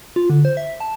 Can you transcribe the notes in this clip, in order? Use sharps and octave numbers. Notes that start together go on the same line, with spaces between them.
F4
D3
C5
E5
A5